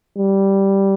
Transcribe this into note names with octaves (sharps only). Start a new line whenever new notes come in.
G3